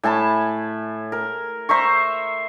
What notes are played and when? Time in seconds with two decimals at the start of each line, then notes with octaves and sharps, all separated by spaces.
0.03 A2 G#5 A5 B5
1.12 A#4
1.69 C5 E5 A#5 C#6